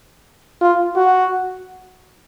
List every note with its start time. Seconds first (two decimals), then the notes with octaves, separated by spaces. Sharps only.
0.61 F4
0.96 F#4